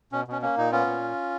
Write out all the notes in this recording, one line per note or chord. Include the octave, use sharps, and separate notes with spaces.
B2 C#4
B2 C#4
A#3 C#4
A#2 D#4
B3 C#4 F4
A#2